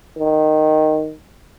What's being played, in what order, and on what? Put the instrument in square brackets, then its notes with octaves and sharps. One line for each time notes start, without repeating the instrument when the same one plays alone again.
[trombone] D#3